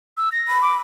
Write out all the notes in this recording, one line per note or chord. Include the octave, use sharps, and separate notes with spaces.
E6
A#6
B5
D6